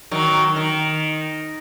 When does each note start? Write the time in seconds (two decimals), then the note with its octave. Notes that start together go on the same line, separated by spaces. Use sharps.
0.11 D#3 F#3
0.56 D#3